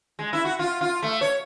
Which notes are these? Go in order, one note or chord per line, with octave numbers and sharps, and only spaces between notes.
G#3
E4
F#4
F4
F4
A3
C#5